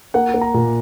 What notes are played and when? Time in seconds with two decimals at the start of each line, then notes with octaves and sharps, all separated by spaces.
0.14 A#3 F#5
0.34 A#3
0.41 A#5
0.54 A#2